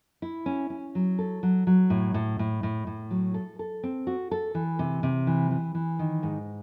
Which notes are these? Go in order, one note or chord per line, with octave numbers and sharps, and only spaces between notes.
E4
C#4
C#4
F#3
A4
F#3
F#3
A2
A2
A2
A2
A2
F#3
A4
A4
C4
F#4
A4
E3
C3
C3
E3
E3
E3
D#3
G#2